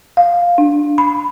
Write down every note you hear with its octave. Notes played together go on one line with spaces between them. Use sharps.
F5
D4
B5